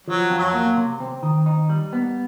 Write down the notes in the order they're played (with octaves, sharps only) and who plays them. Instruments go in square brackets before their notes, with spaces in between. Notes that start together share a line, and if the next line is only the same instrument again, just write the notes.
[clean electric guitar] F3 [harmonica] F#3
[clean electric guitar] F2
[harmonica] F#3
[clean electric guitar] A#3
C3
C4
D#3
D#4
G3
B3